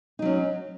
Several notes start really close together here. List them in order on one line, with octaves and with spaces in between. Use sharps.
D#4 F#3 C#4